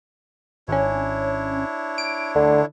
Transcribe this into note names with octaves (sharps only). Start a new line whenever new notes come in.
G#1 C#4 D4 E4 C#5
D7
D2 D3